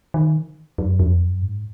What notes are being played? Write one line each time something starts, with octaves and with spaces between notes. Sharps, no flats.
D#3
F#2
F2
F#2
G#2